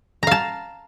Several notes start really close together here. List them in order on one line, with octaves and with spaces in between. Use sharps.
A#5 F5 A5